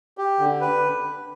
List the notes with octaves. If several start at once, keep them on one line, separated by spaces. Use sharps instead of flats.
G4
D3
B4